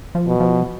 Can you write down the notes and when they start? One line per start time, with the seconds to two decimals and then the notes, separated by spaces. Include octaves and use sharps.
0.15 F3
0.27 B2
0.40 F3